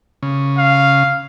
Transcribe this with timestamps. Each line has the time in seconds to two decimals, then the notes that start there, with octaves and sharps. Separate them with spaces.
0.23 C#3
0.58 F5